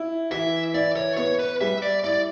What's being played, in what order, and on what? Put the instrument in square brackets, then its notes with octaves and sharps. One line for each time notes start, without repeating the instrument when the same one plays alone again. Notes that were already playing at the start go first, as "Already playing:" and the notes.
Already playing: [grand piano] E4
[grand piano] E3 [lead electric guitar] E5
[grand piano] E4 [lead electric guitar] D5
[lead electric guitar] C#5
[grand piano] B3 [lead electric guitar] C#5
[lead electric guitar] B4
[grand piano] G3 [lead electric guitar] E5
[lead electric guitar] D5
[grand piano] E4 [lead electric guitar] D5